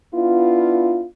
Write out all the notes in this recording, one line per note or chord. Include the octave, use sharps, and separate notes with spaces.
B3 D4 E4 F4